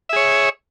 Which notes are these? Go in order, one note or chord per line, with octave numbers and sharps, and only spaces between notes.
G#4 C#5 E5